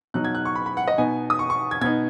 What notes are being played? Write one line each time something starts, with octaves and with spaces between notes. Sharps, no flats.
B2 F#3 D#4 F#6
G#6
F#6
C#6
B5
B5
F#5
D#5
B2 B3 D#4 G#5
D#6
C#6
C#6
G#6
B2 B3 D#4 G#6